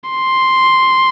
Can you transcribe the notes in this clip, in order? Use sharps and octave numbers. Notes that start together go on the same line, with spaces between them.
C6